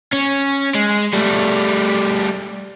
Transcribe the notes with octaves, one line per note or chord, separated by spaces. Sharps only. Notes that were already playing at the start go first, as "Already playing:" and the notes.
C#4
G#3
G3 A3